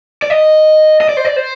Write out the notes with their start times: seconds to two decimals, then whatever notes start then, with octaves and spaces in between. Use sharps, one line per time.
0.22 D5
0.30 D#5
1.01 D#5
1.09 D5
1.17 C5
1.25 D5
1.36 C5